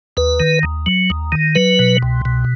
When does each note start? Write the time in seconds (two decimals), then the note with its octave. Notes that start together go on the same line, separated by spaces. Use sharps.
0.17 D#2 B4
0.40 D#3
0.63 D#2
0.86 F#3
1.10 D#2
1.32 D#3
1.55 F#3 B4
1.79 B2
2.02 C2
2.25 B2